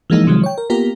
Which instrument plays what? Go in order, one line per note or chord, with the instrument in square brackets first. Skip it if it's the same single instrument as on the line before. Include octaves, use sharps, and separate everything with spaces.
[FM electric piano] E3 F3 G#3 A#3 D#4
C3 D#3 F3 F#3 G#3
C#5 G5
A#4
A#3 B3 F4 G4 A#4